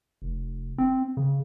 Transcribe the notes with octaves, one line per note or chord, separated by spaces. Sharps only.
F1
C4
C#3